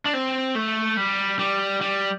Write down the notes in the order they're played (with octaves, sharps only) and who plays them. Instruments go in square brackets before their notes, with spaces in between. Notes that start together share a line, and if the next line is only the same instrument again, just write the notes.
[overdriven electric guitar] D4
C4
A3
G3
G3
G3